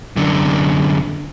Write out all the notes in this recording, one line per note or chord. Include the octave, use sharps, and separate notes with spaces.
F#2 D3